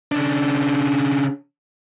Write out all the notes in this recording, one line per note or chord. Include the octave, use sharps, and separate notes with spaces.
C#3 D4